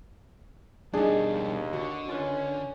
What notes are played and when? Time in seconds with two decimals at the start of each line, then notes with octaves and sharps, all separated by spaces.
0.94 D#2 B2 G3 D4 D#4 G#4
1.30 D#2
1.73 D3 F#4
2.09 C#4 F4 A#4 B4